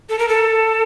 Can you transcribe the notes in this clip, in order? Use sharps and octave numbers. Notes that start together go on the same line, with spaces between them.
A4
A#4
A4